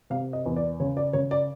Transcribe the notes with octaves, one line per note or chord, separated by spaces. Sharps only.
C3 F5
D#5
E2
D5
C#3 C#5
D5
C#3 C#5
D5